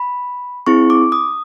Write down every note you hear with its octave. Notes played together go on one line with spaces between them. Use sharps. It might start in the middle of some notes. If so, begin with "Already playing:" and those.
Already playing: B5
C4 E4 G#4 C#6
D6
D#6